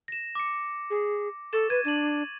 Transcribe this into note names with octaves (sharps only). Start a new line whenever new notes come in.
A#6 E7
D6 C#7
G#4
A4 C#6 A6 E7
B4 G#6 D#7
D4 G#6 D#7 F#7